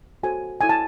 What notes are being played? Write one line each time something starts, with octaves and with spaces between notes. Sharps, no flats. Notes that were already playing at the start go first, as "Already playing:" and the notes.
F#4 A4 C5 G#5
E4 A4 C#5 G#5
A5